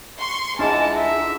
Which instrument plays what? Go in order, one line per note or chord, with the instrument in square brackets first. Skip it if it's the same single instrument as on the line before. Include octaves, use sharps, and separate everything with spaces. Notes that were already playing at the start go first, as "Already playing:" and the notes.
[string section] C6 C#6
[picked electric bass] C2 C#4 [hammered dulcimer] D3 E3 F3 [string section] G#3 D#4 [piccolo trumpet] A5
[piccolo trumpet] E5